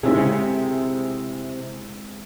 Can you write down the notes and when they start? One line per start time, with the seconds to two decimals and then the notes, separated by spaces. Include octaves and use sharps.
0.03 C3 G#3 C4 E4 G#4
0.15 C#3
0.26 C3